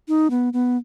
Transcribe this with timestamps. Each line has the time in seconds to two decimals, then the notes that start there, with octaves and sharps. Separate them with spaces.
0.08 D#4
0.30 B3
0.53 B3